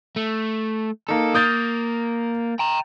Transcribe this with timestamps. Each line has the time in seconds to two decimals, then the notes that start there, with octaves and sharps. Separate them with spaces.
0.16 A3
1.09 A#3 D#4 A4
1.34 A#3 D#6 G6 A6
2.59 G5 A#5